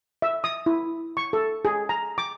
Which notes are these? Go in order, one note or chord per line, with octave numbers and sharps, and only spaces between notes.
E5
D#6
E4
C#6
A4
G#4
A#5
D6